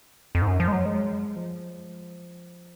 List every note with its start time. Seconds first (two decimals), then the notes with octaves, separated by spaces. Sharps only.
0.35 F2
0.42 G#2
0.47 F#2
0.60 F3
0.68 G#3
0.73 F#3
0.85 G#3
1.36 F3